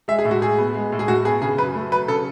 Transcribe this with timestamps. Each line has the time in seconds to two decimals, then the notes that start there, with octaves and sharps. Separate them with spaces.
0.08 G#3 E5
0.19 G#4
0.25 A2
0.31 F#4
0.41 A2 G#4
0.58 B3
0.74 G#3
0.92 A2
0.99 G#4
1.08 A2 F#4
1.25 B3 G#4
1.42 C#3 G#4
1.58 F#2 B4
1.75 A3
1.91 F#3 B4
2.08 C#3 A4